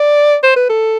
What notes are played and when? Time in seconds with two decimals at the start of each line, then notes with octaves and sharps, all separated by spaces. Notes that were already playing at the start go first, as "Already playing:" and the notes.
Already playing: D5
0.44 C5
0.56 B4
0.69 A4